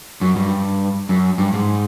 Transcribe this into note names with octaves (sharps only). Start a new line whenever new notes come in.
F#2
G2
F#2
G2
G#2